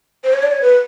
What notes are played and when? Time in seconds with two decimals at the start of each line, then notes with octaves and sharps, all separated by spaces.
0.24 C5
0.33 C#5
0.43 D5
0.52 C#5
0.62 B4